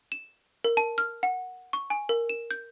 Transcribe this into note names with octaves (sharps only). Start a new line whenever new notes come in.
E7
A#4
A5
F6
F#5
C#6
G#5
A#4
E7
G6